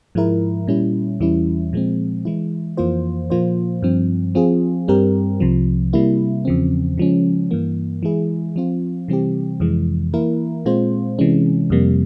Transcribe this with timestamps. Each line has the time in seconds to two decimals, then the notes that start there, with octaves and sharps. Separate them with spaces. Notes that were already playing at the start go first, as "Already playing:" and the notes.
0.15 G#2 F3 G#3 E4 A#4
0.67 A#2 G3 C#4 E4
1.20 E2 E3 G3 C#4 E4
1.73 A#2 F3 G#3 C4
2.25 E3 G#3 E4
2.77 F2 E3 A#3 F4 C5
3.30 A#2 F3 A#3 F4 C5
3.82 G2 F3 C4
4.35 F3 C4 F4 G#4
4.88 G2 G3 C4 G4 A#4
5.40 C2 C3 F3
5.93 C3 G3 A#3 E4
6.45 E2 C#3 F3 C4
6.98 C#3 F3 G#3 C#4
7.51 G2 E3 A#3
8.03 E3 G#3 E4 G#4
8.56 F3 C4 F4
9.08 C3 E3 G3 C4 G4
9.60 F2 C3 E3 G#3
10.14 E3 A#3 E4 A#4
10.66 A#2 G#3 C4 F4 C5
11.19 C3 E3 G#3 C#4
11.70 F2 C3 G3 A#3